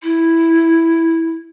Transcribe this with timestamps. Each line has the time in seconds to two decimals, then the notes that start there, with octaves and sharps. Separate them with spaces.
0.03 E4